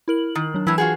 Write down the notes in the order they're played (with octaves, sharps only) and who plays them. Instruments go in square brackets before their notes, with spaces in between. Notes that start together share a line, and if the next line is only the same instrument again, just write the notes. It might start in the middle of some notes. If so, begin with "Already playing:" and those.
[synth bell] E4 A#4 F#7
[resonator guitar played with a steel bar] D#3
[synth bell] F#3 D4
[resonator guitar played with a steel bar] A2 E4 [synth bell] E3 G#6
[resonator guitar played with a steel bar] F4 F#4 G#4